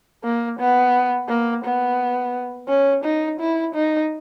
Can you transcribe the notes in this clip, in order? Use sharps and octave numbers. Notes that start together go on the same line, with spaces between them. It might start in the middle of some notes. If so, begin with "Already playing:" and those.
A#3
B3
A#3
B3
C#4
D#4
E4
D#4